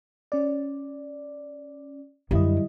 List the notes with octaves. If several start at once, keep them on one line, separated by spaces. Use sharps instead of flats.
C#4 D5
F#2 D3 G3 E4 D#5